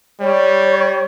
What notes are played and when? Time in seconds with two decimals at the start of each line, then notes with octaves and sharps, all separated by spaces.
0.20 G3 C#5